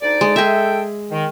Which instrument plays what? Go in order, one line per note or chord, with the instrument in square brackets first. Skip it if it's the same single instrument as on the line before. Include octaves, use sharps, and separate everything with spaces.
[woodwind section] D2 D#4 D5
[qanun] G#3
[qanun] G#4 E5 [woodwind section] A4 G5
[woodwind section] D#3